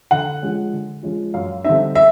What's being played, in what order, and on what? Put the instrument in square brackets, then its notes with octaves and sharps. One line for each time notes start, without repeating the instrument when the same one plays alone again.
[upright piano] D3 F#5
F3 G#3 C#4
D3
F3 G#3 C#4
F#2 F5
D3 G3 C4 D#4 E5
E5